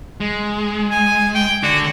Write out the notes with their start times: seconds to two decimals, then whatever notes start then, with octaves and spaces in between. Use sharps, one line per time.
0.20 G#3
0.91 G#5
1.35 G5
1.63 D3 D4 F#4